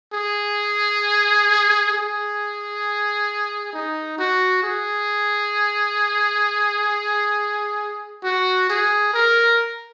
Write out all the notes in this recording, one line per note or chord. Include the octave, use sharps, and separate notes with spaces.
G#4
G#4
D#4
F#4
G#4
F#4
G#4
A#4